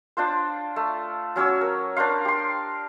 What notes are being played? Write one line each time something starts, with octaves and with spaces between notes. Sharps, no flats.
D4 F4 C5
A3
F#3 C#4 C#5 E6
A#4
D4 A#4 C5 F5
G4 C6